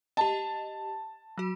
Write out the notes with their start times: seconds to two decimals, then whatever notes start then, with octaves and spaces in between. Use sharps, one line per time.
0.17 G4 D#5 A5
1.38 F#3 F#4